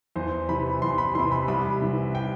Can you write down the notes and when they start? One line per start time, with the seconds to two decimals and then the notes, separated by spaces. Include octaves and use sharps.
0.16 E2 C5
0.49 C3 E3 B5
0.82 E2 C6
0.98 B5
1.15 C3 E3 C6
1.32 B5
1.48 C2 B5
1.81 C3 E3
2.15 G5